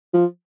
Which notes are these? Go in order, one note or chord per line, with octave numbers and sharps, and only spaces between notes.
F3